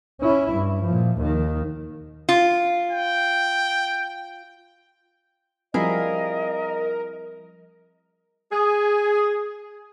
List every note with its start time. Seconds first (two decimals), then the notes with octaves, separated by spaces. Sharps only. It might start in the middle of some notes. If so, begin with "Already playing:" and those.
0.21 C#4 E4
0.53 G2
0.84 A#2 F3
1.17 D#2 D#3
2.29 F4
2.92 G5
5.74 F3 G3 C4 E4 G#4 A#4 D#5 F5
8.52 G#4